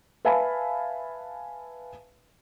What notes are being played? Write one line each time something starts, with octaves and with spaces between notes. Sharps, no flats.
B4 E5 F5 G#5 A5 B5